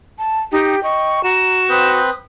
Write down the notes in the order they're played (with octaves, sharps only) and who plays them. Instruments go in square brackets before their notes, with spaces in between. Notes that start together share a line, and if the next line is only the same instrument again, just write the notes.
[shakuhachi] A5
[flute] D#4 [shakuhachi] G4 [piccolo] G5
[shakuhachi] D#5 [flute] C#6
[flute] F#4 [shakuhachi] A#5 [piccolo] E7
[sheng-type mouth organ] C4 B4 G6 [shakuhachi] D#6